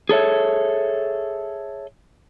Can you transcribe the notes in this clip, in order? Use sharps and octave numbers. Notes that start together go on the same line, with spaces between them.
G#4 A4 C#5 E5